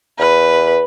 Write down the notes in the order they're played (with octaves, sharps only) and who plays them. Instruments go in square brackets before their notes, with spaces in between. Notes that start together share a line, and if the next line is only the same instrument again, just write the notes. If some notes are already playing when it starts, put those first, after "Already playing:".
[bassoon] E2 [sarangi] B4